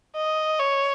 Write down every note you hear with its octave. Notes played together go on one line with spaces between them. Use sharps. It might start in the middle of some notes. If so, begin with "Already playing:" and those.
D#5
C#5